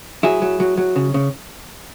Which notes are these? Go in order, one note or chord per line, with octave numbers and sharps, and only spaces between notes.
F#3 E4 G#4
F#3
F#3
F#3
C#3
C#3